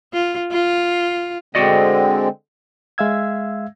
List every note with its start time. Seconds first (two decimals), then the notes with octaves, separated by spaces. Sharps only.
0.13 F4
0.51 F4
1.55 D3 G#3 C4 F#4 D5 D#5
2.98 G#3 E5 F5 E6 G#6